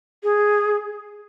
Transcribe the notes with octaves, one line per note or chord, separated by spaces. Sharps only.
G#4